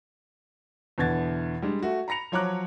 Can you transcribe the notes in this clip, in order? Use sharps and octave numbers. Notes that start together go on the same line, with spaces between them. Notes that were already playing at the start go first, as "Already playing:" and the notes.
E2 B2 D3 E3 G#6 A6
G3 G#3 D4
A3 F#4
A#5 B5 A#6 C#7 F7
F3 F#3 C#5 A#5 D6 F#6